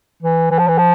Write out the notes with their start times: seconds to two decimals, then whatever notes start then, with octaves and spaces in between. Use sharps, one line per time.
0.22 E3
0.51 E3
0.59 F3
0.68 E3
0.78 F3